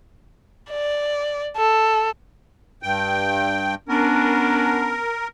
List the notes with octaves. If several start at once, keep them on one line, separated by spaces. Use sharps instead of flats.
D5
A4
G2 G5
B3 C#4 D4 A#4